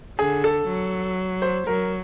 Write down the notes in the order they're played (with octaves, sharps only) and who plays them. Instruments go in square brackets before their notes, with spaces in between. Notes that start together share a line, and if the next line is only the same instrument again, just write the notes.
[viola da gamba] D3 [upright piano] G#4
[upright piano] A4
[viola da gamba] F#3
[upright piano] C5
[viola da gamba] F#3 [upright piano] A#4